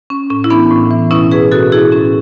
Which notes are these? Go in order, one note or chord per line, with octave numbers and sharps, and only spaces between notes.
C#4
A2 C#4
E4
E3 B3 D4
A2
E3
B2 C#4 E4
G#4 B4
B2 F#4 A4
E4 G#4
A2 C#4